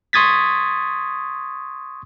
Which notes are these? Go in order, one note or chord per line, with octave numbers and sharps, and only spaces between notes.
C6 C#6 D#6 G#6 A6 B6